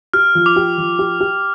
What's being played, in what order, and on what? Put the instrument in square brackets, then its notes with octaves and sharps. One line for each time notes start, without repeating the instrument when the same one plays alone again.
[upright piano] G4 [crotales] F6
[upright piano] F3
[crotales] D6
[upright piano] G4
F3
G4
G4